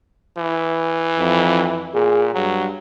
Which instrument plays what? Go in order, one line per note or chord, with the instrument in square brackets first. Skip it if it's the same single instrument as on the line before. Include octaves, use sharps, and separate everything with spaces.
[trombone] E3
[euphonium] F2
[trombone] A#2 [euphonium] G#4
[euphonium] G2 [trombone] F#3